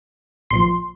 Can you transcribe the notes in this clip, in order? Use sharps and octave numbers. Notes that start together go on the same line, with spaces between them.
A#1 A#2 F3 C6